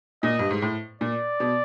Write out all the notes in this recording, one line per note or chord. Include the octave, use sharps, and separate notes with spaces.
A#2 D#5
G2
G#2
A2
A#2 D5
B2